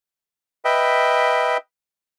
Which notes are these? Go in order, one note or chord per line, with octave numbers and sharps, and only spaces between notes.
B4 D#5 E5 G5